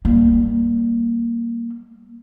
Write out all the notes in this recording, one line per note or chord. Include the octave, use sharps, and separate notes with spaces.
G3 A#3